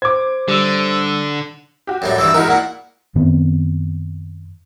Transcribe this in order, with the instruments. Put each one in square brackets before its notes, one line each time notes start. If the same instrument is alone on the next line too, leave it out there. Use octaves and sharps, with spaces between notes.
[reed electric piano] C5 [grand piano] D6 G#6
[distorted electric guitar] D3 [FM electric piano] G3 E6
[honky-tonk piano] F#4 G4
[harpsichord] F#2 A2 G3
[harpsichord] G2 D#3 E3 [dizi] E6
[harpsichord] G#3 D#4 [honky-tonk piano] E4 F#4 A#4
[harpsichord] A#2 [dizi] F#5
[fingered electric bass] F#2 D#3 B3 C4